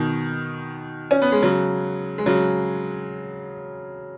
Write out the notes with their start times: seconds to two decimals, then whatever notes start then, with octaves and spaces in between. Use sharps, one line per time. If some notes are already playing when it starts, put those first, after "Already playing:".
Already playing: B2 D#3
1.11 C#4
1.22 B3
1.32 G#3
1.42 C#3 F#3
2.18 G#3
2.26 C#3 F#3